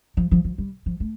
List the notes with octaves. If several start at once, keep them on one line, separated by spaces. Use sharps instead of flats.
F3
F3
F3
G3
F3
A3